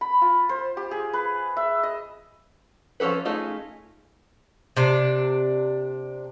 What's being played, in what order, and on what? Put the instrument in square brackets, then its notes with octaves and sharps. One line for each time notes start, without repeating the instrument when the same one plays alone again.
[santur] B5
F4
C5
G4
G#4
B4
E5
D#5
[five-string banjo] F3 C#4 F#4 A4 B4
A3 C#4 D#4 F4 G#4
[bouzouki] C3 D4